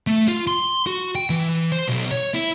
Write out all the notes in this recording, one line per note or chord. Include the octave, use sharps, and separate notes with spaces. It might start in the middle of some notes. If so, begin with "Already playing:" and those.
A3
F4
C6
F#4
G5
E3
C5
B1
C#5
E4